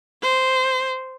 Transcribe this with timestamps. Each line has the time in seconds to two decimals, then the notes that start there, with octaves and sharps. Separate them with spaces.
0.22 C5